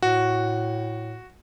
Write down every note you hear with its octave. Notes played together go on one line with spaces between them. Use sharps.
A2 F#4